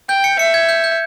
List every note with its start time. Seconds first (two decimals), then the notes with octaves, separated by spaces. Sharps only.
0.09 G5 G6
0.24 C#7
0.39 E5 C#7
0.54 G#6
0.69 G6
0.84 G6